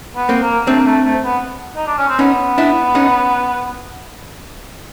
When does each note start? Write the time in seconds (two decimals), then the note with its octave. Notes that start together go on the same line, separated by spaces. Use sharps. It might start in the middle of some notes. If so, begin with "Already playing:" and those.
0.16 B3
0.29 A#3 C4
0.41 A#3
0.67 A3 C4 D4
0.80 A#3
0.86 A3
1.05 A3
1.24 B3
1.76 D#4
1.87 D4
1.98 C#4
2.08 C4
2.19 B3 C#4 D#4
2.58 D4 E4
2.95 C#4 D#4